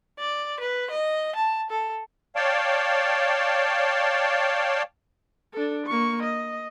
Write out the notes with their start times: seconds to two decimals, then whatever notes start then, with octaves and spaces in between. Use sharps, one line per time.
0.19 D5
0.60 B4
0.90 D#5
1.36 A5
1.70 A4
2.36 C#5 D5 F5 G5 A5
5.53 D4 A4
5.86 A#3 C#6
6.23 D#5